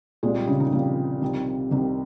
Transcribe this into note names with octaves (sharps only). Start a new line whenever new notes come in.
C2 A#2 G#3 G#4
G3 G4
C#3 C#4
D#3 D#4
C2 A#2 F3 F4
C2 C3 D#3
C2 C3 D#3